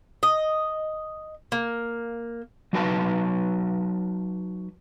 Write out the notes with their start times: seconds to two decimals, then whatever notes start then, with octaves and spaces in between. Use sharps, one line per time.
0.23 D#5
1.52 A#3
2.73 F#3 D#4 F#4 B4 G5 A5